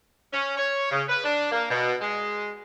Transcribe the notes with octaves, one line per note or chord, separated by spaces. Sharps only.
C#4
C#5
C#3
B4
D4
A#3
B2
G#3